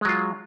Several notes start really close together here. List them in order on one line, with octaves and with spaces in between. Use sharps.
G#3 F#3 F4